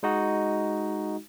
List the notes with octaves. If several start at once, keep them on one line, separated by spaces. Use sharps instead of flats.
G#3 D#4 F#4